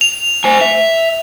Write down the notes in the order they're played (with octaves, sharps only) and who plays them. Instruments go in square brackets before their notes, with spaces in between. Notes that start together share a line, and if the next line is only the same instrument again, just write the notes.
[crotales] F7
[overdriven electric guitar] C5 G#5
E5